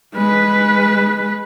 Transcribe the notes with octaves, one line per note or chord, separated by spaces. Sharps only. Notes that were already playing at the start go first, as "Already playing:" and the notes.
G#3 B4